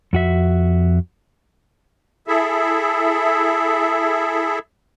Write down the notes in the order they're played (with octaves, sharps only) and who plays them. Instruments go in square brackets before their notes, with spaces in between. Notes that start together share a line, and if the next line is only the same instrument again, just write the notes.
[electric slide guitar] F2 F#4 E5
[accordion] E4 G#4 A4 E5